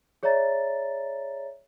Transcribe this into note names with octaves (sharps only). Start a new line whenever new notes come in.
G#4 C#5 D5 E5 A#5 A6